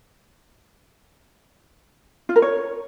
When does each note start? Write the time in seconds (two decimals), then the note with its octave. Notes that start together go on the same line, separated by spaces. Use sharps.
2.29 F4
2.36 A#4
2.42 C#5